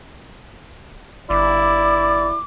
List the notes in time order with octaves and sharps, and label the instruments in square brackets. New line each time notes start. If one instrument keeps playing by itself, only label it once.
[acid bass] G1 [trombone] E4 [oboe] D5 [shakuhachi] D6